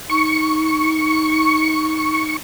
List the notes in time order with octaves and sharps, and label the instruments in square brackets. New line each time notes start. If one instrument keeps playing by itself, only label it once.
[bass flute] D#4 [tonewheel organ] C#6